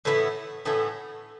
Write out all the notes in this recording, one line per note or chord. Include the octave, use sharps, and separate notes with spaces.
A2 E3 B3 E4
A2 E3 B3 E4